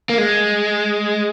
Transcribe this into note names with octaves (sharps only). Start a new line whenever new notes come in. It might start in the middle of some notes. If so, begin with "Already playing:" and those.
A#3
G#3